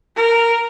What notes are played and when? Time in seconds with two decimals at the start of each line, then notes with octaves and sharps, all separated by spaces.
0.16 A#4